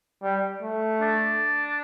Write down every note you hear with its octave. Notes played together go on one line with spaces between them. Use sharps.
G3
A3
D4